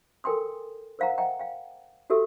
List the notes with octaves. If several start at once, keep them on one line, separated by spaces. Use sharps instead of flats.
A4 A#4 G5 G#5 C6 D#6
A#4 C5 F5 F#5 A#5
D#5 E5 F#5 G5 A#5
F5 G5
F#4 G4 A4 E5 E6